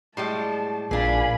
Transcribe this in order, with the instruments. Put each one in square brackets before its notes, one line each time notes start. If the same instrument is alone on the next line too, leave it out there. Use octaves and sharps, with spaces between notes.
[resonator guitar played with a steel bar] A2 G3 G#3 [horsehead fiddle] A5
[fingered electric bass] A#1 [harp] A#2 F5 [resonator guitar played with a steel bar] D4 G#4 [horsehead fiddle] G#5 B5